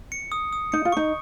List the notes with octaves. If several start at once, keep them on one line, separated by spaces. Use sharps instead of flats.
C#7
D#6
D#6
D#4 C#7
F4
D#4 C#6